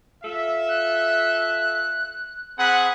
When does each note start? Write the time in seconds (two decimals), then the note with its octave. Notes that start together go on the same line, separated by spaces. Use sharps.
0.24 F4 A4 E5
0.69 F#6
2.59 C4 G#4 F#5 B5